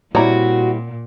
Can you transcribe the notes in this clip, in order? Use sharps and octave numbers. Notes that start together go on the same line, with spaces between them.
A#2 G3 C4 E4 F#4 C#5 D5 A#5